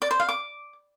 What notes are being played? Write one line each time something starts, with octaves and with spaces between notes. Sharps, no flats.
D5
C5
F5
D6